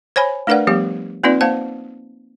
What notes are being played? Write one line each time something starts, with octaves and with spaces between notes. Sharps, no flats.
C5 C#5 G#5 B5
A3 D4 A#4 B4 D5 F#5
F3 G3 A3 B3 G4
A#3 C4 D#4 F4 B4 D5
A#3 C5 F5 A5